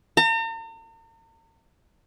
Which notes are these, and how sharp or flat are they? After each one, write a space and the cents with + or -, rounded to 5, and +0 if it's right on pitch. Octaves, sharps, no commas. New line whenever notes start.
A#5 -45